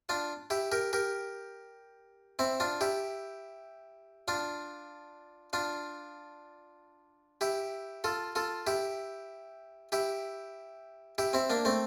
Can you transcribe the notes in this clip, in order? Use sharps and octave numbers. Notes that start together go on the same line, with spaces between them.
D4 F4
E4 G4
G4 A#4
G4 A#4
C4 E4
D4 F4
E4 G4
D4 F4
D4 F4
E4 G4
F4 A4
F4 A4
E4 G4
E4 G4
E4 G4
C4 E4
A#3 D4
A3 C4